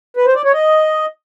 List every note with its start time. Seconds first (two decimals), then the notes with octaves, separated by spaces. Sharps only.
0.17 B4
0.26 C5
0.35 D5
0.45 C#5
0.54 D#5